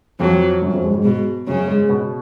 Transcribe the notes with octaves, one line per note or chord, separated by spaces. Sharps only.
F2 F3 F#3
F#2 F#3
F2 F3
G#2 G#3
G#2 G#3
G#2 B2 G#3
F#2 C#3 F#3
G#2 G#3
B2 B3